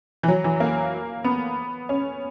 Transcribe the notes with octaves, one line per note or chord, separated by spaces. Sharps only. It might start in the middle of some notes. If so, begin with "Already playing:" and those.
E3
F#3
E3
A#3
B3
C#4